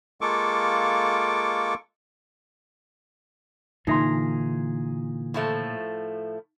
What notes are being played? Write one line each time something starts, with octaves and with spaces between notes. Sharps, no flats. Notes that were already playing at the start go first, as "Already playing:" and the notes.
G#3 A#3 F4 A4 C#6 D6
A#2 D3 E3 D#4 G#4 E5 A#5 C6
A2 F3 A3